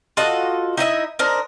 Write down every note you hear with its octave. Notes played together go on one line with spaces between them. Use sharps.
F4 F#4 A4 D#5
D#4 E4 D#5 E5
D4 D#4 A#4 C5